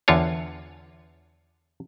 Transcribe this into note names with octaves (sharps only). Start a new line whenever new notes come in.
E2 D3 F4 C#5